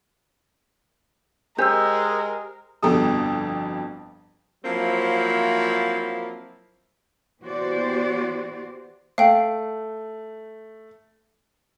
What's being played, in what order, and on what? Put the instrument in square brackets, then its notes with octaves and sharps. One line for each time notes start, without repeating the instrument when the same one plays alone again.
[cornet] G#3 [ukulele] G4 C5 G#5 [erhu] A#4 [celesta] E6 G6
[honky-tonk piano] G1 F2 B2 A4 D#6
[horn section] F3 F#3 A#3 C4 E4
[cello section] E3 B3 F#4 G4 C5 D5
[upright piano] A3 [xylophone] F5 G5